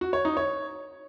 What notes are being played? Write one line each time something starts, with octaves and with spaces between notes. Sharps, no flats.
F#4
C#5
D#4
C#5